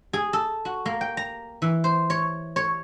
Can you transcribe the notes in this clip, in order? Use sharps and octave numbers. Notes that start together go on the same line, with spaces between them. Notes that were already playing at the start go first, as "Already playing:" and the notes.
G#4
A4
F#4
A#3
G5
A#5
E3
C5
C#5
C#5